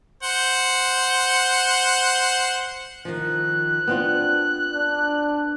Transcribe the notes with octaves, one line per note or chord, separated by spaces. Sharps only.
C5 F#5
D#3 F3 F#6
B3 C4 D4 F4
D4